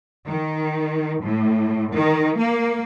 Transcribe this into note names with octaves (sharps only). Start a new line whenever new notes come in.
D#3
A2
D#3
A#3